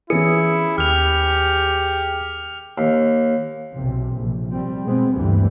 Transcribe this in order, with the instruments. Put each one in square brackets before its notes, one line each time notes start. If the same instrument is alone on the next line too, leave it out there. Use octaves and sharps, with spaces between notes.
[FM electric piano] E3 D#6 [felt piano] B3 C#4 G#4 [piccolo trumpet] E4 [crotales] C#7
[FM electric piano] D#2 [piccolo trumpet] G4 [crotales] F6 F7
[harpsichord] D#2
[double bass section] B1 E2 C3
A#1
G3 C4
B2 G#3 B3 C4
D2 G2 E3 G3 B3